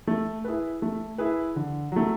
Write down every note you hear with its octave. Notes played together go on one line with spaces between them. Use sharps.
A3
E4 G#4 B4
A3
E4 G#4 B4
D3
F#3 A3